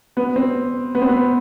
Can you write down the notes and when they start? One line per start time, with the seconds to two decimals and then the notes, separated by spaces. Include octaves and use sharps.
0.17 B3
0.36 C4
0.95 B3
1.02 C4
1.09 B3